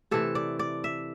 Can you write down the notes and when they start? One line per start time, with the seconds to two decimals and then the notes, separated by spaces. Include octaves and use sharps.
0.11 C3 E3 A3 A4
0.35 D5
0.59 D5
0.84 E5